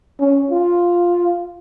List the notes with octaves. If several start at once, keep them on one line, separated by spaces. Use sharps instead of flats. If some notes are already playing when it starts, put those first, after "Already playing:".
C#4
F4